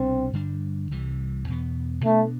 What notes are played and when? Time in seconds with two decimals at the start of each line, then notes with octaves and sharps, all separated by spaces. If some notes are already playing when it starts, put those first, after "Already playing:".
Already playing: C2 B2 G3 C4 D4
0.33 G2 D3 G3 D4
0.91 C2 C3 E3 G3
1.48 E2 B2 B3
2.05 B2 A3 B3 D4